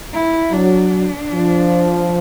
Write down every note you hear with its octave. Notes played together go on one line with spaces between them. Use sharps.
E4
F#3 D4
F3